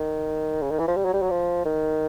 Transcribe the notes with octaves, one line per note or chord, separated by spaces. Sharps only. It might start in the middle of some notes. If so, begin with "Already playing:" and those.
Already playing: D#3
C#3
D#3
E3
F3
G3
F#3
G3
F#3
F3
D#3